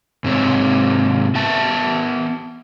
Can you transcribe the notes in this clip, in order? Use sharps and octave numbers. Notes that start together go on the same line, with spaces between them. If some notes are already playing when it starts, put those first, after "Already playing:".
G#2 C3 C4 C#5
B3 E5 A5